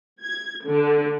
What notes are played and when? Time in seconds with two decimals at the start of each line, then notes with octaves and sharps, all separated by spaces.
0.23 G#6
0.67 D3